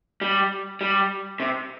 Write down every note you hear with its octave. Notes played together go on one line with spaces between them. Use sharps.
G3
G3
C3